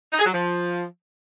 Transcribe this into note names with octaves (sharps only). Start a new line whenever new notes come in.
D#4
G#4
F#3
F3